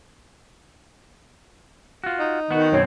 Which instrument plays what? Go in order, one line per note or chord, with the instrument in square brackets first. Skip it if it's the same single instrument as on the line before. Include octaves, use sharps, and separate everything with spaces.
[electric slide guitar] F4 F#4
[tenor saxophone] D#4
[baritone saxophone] D#3 [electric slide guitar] B3 F#4
[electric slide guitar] F#2 B2 C4 [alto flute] C#5